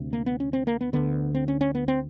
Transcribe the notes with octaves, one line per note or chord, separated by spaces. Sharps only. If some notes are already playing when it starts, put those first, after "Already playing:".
Already playing: D2 C3
A#3
B3
C#4
C4
A#3
B3
D2 D3 B3
C4
C#4
C#4
B3
C4